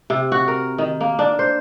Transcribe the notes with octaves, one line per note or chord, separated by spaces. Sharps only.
C3
F#4
A#4
D#3
A#3
D4
C5